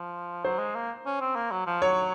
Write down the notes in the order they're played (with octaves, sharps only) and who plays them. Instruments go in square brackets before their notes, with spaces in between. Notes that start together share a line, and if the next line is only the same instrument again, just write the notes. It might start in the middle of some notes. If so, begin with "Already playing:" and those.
Already playing: [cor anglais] F3
[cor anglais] F#3 [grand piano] C5
[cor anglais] G#3
A#3
C#4
C4
A#3
F#3
F3
[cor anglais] F#3 [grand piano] C#5